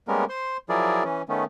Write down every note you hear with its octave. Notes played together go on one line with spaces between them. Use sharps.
G3 G#3 A#3 B3 C#4 A#4
C5 C6
F3 F#3 E4 G#4 A#4 D5
E3 C#4
D#3 A3 B3 C#4